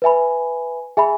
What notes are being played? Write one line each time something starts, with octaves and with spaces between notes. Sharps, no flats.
B4 E5 G#5 B5
G#4 E5 G#5 B5